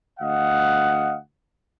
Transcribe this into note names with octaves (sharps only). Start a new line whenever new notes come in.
D2 D#5 F5 F#5